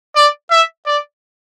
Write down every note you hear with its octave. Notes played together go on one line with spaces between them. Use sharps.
D5
E5
D5